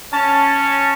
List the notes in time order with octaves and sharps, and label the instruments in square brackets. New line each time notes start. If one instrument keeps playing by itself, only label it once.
[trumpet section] C#4 [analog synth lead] A5